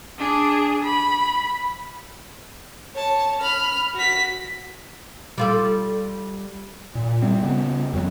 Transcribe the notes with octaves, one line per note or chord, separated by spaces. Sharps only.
D4 G#4
B5
C#5 A5
B5 F6
F#4 B6
G3 F4 A4
A#2
G3 C4
C#3 B3
F2 F#3